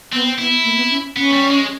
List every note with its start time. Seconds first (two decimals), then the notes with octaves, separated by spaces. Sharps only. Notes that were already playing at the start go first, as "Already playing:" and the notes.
0.13 B3 C4
0.39 B3 E4
0.64 A#3
0.77 B3
0.91 C#4
1.16 B3 C#4
1.33 G3
1.51 G#3